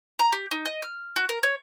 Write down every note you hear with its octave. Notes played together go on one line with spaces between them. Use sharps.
A#5
G4
D#4
D#5
F6
F#4
A#4
C#5